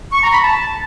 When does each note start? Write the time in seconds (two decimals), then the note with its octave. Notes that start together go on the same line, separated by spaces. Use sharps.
0.13 C#6
0.23 A#5
0.33 B5
0.43 A5